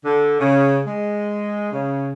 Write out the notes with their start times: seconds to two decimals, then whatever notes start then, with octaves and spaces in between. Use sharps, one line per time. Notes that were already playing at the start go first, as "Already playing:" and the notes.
0.04 D3
0.40 C#3
0.86 G#3
1.72 C#3